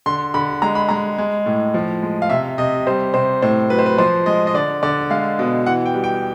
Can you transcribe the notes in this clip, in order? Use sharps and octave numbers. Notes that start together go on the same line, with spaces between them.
D3 C6
D3 B5
G#3 A#5
B5
G#3 A#5
G#3
A2
F3
G#3
F5
C3 E5
C3 D#5
G3 C5
C3 C5
A2 C5
F#3 B4
C5
B4
F3 C5
G#3 D#5
D#5
D3 D5
D3 D5
G#3 F5
B2
E3 F#5
G5
G3
G5